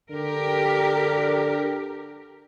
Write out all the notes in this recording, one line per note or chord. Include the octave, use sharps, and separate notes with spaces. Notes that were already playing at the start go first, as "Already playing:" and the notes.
D3 G4 A#4